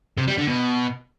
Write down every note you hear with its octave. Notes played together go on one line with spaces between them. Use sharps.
C3
G3
D3
B2